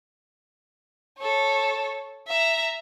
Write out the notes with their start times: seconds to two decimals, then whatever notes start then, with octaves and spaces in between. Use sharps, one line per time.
1.19 A4 C#5
2.28 E5 A#5